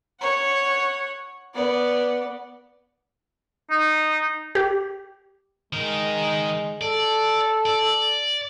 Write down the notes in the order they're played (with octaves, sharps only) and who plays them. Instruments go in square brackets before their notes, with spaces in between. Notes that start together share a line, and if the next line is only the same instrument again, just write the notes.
[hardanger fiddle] C#5 F#5
B3 D5
[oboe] D#4
[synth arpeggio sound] G4
[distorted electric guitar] D#3 A#4 [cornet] G#3
[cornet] A4 [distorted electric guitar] D5
[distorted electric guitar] D5